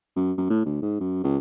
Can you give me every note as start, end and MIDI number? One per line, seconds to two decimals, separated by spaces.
0.16 0.32 42
0.38 0.49 42
0.50 0.60 45
0.66 0.78 38
0.82 0.98 44
1.00 1.19 42
1.23 1.37 37